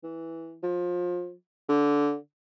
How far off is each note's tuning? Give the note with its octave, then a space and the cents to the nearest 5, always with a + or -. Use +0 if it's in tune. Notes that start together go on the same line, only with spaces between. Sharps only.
E3 -5
F3 +25
D3 -15